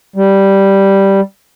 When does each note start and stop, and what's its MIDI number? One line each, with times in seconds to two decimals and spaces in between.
0.16 1.21 55